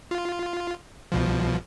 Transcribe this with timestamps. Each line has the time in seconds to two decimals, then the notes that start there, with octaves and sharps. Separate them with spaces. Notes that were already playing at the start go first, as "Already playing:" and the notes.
0.11 F4
1.12 C2 B2 F3